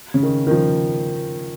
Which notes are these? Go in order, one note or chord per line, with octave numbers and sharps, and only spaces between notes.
C#3
D#3
D#3
F3